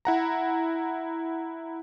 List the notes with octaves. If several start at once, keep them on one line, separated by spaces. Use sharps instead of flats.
E4 F#5 A#5